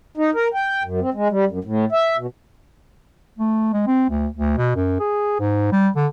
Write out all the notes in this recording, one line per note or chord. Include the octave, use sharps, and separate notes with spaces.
D#4
A#4
G5
F#2
C4
G#3
G3
F#2
A2
E5
B2
A3
G#3
C4
D2
D2
B2
F#2
G#4
G#2
G3
D3